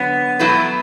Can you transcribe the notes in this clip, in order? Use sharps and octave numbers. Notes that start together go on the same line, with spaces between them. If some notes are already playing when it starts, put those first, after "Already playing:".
Already playing: D3 F#3 B3
B2 F#3 A3 E4 B4